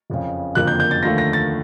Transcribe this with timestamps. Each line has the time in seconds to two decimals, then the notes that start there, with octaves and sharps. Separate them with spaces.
0.10 F#1 F2 C#3
0.55 F#1 F2 D3 F3 A#3 F#6
0.67 G6
0.80 G6
0.91 A6
1.03 D#2 D3 F3 A3 A#6
1.18 A#6
1.33 A6